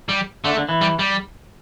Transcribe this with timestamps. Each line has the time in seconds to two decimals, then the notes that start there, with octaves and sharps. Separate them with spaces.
0.09 G3
0.44 D3 A3
0.57 D3
0.69 E3
0.81 G3
0.99 G3